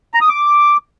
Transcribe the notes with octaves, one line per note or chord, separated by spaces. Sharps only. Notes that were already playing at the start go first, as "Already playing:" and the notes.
A#5
D#6
D6